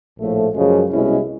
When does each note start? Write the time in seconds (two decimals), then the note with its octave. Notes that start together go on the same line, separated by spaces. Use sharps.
0.17 A#1 A2 F3 A3
0.54 F#2 C#3 F3 G#3
0.90 C2 B2 G#3 C#4 E4